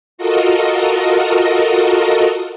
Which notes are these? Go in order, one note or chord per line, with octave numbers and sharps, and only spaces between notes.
F4 F#4 A4 A#4 D#5